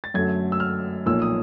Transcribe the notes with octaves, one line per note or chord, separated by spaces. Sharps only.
A6
F#2 D3 F#3 A3 G#6
E6
F6
B1 A#2 F3 A#3 E6
D#6